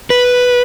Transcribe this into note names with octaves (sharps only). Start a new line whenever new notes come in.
B4